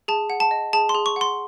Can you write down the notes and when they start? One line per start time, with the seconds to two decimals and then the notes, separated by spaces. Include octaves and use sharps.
0.08 G#4 A5
0.30 F#5
0.40 A5
0.51 D#5
0.73 G#4 A5
0.89 C6
0.95 G#4
1.06 C#6
1.16 F#5 C6